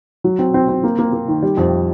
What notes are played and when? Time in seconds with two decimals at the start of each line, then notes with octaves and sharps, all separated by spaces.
0.24 F#3
0.39 C4
0.54 C4
0.69 C4
0.83 A#3
0.98 A#3
1.13 A#3
1.28 D#3
1.43 G3
1.57 F2